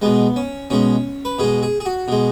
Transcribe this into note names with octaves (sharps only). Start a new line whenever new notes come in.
B2 G#3 B3
C#4
B2 G#3 C#4
B4
B2 G#3 G#4
G#4
G#4
F#4
B2 G#3